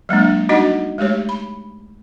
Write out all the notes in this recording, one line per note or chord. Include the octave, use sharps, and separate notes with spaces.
F#3 G#3 A#3 D4
G3 D4 D#4 F#4 D#5 F#5
G#3 A3 G4 C#5
B5